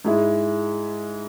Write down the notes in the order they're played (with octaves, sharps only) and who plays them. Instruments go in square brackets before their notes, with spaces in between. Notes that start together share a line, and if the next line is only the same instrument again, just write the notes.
[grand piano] G#2 G#3 E4